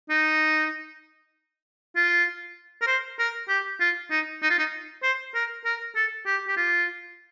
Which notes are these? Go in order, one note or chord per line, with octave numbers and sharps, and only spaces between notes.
D#4
F4
A#4
C5
A#4
G4
F4
D#4
D#4
F4
D#4
C5
A#4
A#4
A4
G4
G4
F4